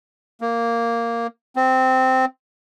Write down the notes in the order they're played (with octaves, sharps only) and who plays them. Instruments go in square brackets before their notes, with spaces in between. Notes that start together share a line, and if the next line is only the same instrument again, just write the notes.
[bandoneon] A#3
C4